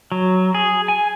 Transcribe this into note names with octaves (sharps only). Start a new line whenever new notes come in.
F#3
G#4
G#5